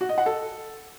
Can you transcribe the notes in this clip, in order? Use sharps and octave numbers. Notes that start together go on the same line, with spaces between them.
F#4
D#5
F#5
A4